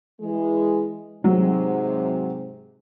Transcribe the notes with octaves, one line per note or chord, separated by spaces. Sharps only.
E3 G#3
G#2 C3 F#3